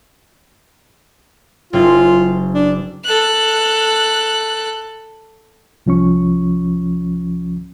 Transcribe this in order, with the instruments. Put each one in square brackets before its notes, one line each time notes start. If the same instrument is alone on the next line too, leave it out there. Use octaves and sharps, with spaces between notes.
[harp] F#1 C4 C#4 [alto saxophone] F4
[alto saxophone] D4
[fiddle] A4 F#6
[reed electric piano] C2 F3 C#4 C#6